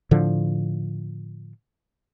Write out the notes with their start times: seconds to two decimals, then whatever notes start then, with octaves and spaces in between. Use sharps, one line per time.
0.11 A2 D3 F3